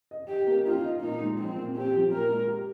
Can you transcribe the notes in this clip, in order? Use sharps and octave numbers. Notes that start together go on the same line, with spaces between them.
D#5
G4 D#5
A#3
D#4 F4
D#5
A#2 D#4
G#3
F3 C4
A#2
C4 G4
F3
A#2 A#4
G#3
G4